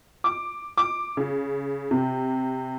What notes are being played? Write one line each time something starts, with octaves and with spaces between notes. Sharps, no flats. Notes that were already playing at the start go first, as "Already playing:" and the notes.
D6
D6
C#3
C3